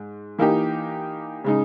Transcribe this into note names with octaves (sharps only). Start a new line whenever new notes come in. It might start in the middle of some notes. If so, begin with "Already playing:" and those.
Already playing: G#2
E3 A#3 D#4 G4
C#3 G#3 D#4